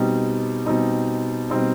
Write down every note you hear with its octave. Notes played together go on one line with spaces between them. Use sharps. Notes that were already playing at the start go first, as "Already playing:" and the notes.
Already playing: B2 G3 C4 D#4
B2 G3 C4 D#4
B2 G3 C4 D#4